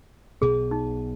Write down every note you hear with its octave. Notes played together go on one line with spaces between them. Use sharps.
B1 B2 B3 G#4
D#4